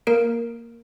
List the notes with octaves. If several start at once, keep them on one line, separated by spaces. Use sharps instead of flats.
A#3 A#4 D7